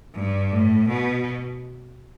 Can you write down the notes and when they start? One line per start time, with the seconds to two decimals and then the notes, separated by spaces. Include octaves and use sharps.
0.14 G2
0.52 A2
0.89 B2